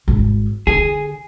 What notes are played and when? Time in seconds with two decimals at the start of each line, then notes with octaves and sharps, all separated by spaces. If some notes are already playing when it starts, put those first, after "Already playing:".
0.08 G#1
0.67 D3 G#4